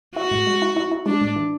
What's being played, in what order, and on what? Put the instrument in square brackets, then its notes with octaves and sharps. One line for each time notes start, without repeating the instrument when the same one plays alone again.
[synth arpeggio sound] E4 [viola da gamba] F#4
[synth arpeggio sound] A2
G#3
E4
E4
E4
[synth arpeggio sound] G#3 [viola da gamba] D4
[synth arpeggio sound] A2
E3